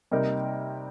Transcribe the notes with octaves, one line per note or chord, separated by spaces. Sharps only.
C3 G3 A#3 D#4 A#4